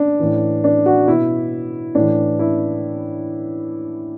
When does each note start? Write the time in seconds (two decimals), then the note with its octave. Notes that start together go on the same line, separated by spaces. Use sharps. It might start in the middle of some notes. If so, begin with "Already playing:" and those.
Already playing: D4
0.19 A2 E3
0.64 D4
0.86 F#4
1.08 B2 E4
1.95 A2 E3 D4
2.39 E4